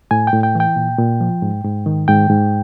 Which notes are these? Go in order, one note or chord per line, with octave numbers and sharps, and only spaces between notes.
A2 G#5
G5
A2
G5
E3 G5
A#2
A#2
F3
G#2
G#2
D#3
G#2 G5
G#2